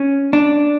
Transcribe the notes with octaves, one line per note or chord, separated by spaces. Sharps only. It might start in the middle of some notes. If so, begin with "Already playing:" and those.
Already playing: C#4
D4